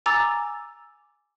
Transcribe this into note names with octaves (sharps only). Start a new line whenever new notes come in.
G#5 A#5 D6 E6 A6